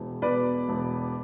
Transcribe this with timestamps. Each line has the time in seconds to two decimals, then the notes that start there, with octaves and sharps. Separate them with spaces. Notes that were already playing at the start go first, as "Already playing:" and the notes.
Already playing: E1 E2
0.22 B2 B4 D5
0.69 E1